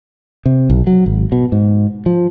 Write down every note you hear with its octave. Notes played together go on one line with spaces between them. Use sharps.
C3
B1
F#3
G#1
B2
G#2
F3